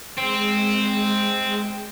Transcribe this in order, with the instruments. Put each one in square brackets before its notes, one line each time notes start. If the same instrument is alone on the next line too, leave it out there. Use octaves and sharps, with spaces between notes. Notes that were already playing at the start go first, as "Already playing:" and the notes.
[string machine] G#3 [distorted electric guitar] C4